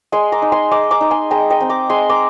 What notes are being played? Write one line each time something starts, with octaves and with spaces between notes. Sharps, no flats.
G#3 G#5 C6
A#5 D6
D#4
G#5 C6
G#3 A#5 D6
A#5 D6
D#4
G#5 C6
G#3 G5 A#5
D#5 G5
C4 D#4
A#5 D6
G#3 G#5 C6
A#5 D6